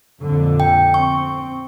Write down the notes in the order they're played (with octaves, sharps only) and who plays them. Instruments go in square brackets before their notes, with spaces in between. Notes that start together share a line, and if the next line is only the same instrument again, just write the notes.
[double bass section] F2 A#2 D3
[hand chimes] G5
[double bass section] C4 [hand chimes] C#6